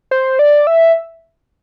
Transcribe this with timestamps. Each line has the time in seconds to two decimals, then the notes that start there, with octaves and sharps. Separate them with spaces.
0.11 C5
0.39 D5
0.67 E5